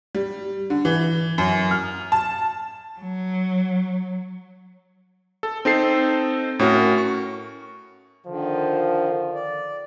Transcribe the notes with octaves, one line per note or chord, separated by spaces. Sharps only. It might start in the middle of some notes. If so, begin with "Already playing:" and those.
G3
D3
E3
F#2
F6
A5
F#3
A4
C4 D#4 A4 C7
A2 C#4 F#4 A#4
C#6
D3 D#3 F3
D5